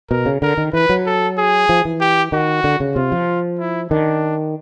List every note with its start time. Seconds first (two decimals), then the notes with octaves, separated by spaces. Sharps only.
0.10 B2 A#4
0.26 C#3
0.42 D3 A#4
0.58 D#3
0.73 E3 B4
0.89 F#3
1.06 A4
1.38 G#4
1.69 F3
1.85 E3
2.00 G4
2.32 D#3 F#4
2.64 D3
2.80 C#3
2.96 C3 F4
3.12 F3
3.59 E4
3.91 D#3 D4